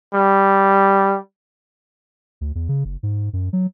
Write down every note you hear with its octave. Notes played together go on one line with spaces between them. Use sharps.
G3
D2
E2
C#3
F#1
G#2
F#2
F#3